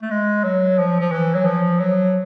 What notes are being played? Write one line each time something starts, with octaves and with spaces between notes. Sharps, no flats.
A3
G#3
F#3
F3
F3
E3
F#3
F3
F#3